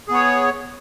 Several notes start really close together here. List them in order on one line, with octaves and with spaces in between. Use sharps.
G#4 B3 C#5